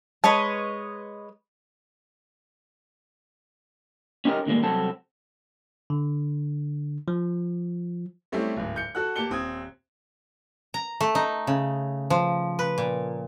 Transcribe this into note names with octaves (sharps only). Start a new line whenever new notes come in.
G#3 B4 C#5 D#5 A5
C#4 D#4 G4 G#4 A#4 D#5
A2 D3 D#3 G3 G#3 A#3
C2 F#3 C4 F#4 A4 A5
D3
F3
G3 A3 C4 C#4 E4 G4
D1 G#2
G6 C#7
F#4 A4 F#5 F#6
A#3 G4 A5 C#7 G7
D#1 C4 D#6 G#6
A#5
A3
D#4
C#3
F3
B4
A#2